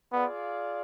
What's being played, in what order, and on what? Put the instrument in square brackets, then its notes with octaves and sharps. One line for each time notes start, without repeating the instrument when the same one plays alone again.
[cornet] B3 [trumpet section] F4 G#4 D5 F5